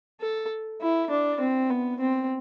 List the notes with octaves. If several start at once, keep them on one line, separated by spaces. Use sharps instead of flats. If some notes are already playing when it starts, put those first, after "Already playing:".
A4
E4
D4
C4
B3
C4